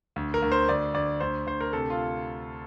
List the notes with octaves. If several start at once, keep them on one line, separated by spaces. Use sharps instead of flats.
D2
A#4
D2
C5
D2 D5
D2 D5
D2 C5
D2 C5
A#4
C3 A4
F4